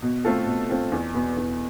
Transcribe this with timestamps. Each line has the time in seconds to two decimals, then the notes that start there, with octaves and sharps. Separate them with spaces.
0.02 B2
0.25 A3 C4 F4 A4
0.46 B2
0.69 A3 C4 F4 A4
0.92 E2
1.14 B2 B3
1.37 E2